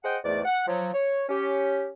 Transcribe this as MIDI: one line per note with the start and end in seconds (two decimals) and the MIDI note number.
0.04 0.17 68
0.04 0.17 72
0.04 0.17 75
0.04 0.17 78
0.04 0.17 79
0.24 0.40 40
0.24 0.40 44
0.24 0.40 57
0.24 0.40 74
0.45 0.64 78
0.67 0.89 53
0.67 0.89 54
0.93 1.24 73
1.29 1.90 61
1.29 1.90 67